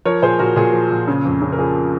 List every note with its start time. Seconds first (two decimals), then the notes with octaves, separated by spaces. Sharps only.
0.05 F3 A#4 C#5
0.22 A#2 G#4 C5
0.39 A#2 F#4 A#4
0.56 A#2 G#4
0.73 F3
0.90 A#2
1.08 C#3
1.25 F2
1.42 C#3
1.52 A#4
1.59 F3 G#4